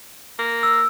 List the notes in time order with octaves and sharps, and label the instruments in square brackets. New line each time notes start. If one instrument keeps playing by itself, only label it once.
[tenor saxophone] A#3
[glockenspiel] E6